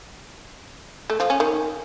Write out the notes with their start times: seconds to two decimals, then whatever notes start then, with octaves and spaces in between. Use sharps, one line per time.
1.10 A3
1.20 F3
1.30 C#4
1.40 D#3